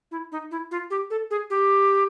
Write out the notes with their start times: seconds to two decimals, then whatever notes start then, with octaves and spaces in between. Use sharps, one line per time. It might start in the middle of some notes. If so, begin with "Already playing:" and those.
0.11 E4
0.32 D#4
0.51 E4
0.71 F4
0.90 G4
1.10 A4
1.31 G#4
1.50 G4